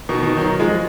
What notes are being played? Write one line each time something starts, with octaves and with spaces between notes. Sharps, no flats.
B2 D#3
B2 D#3
D#3 F#3
F3 G#3